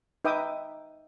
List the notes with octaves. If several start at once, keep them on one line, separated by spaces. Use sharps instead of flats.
D#4 B4 E5 G5 D6 D#6